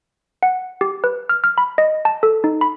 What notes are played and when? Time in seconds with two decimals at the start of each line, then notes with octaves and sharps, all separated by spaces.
0.43 F#5
0.81 G4
1.04 B4
1.29 F6
1.44 F6
1.58 B5
1.78 D#5
2.05 A5
2.23 A4
2.44 D#4
2.61 B5